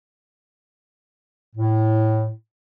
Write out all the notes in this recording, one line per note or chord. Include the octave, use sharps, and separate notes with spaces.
A2